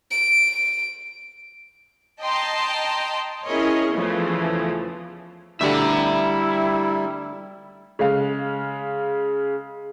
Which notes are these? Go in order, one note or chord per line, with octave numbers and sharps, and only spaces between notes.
D7
D#5 G5 A5 A#5 C6
C#4 E4 G#4 A#4 C#5 D#5
E2 C#3 E3 F3 A3
D2 G2 D3 G3 E4 E5 A#5
C#3 G#3 F5